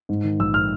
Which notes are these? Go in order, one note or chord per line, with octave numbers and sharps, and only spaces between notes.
G#2
D#3
A#1 E6
F6